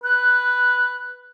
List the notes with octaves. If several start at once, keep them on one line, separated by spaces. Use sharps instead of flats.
B4 F#6